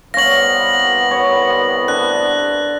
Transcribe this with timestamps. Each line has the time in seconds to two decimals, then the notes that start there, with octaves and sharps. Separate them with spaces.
0.14 C2 B3 C#5 F5 A#6 F#7
1.11 C#5
1.88 D3 F#6